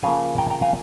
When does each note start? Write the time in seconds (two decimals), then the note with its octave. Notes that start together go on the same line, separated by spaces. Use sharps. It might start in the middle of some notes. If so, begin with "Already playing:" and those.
0.03 C#3 F3 A#3 F5 G#5
0.38 G5 A#5
0.50 G5 A#5
0.62 F5 G#5